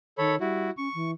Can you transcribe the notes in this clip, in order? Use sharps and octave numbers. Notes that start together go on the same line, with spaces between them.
D#3 A4 C#5 B5
G3 E4 F#4
C#4 C#6
E3